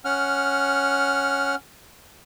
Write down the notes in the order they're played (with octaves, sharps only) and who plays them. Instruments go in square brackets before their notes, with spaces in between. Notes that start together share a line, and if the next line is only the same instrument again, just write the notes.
[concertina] C#4 F#5 F6